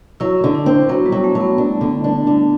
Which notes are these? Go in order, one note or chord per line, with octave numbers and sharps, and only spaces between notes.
F#3 E4
D3
D4
C4
F#3 B3
G3
F#3
A3
F#3
B3
D4
D3
D4
D3